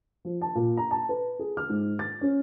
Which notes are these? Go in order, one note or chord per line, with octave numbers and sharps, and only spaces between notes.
F3
A5
A#2
A#5
A5
B4
G#4
F6
G#2
A6
C#4